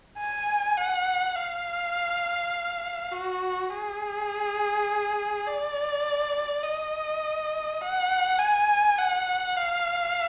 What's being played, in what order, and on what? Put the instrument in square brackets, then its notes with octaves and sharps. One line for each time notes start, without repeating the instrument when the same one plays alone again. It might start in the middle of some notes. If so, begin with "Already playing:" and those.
[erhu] G#5
F#5
F5
F#4
G#4
D5
D#5
F#5
G#5
F#5
F5